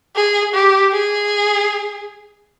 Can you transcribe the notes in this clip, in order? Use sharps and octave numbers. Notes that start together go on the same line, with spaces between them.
G#4
G4
G#4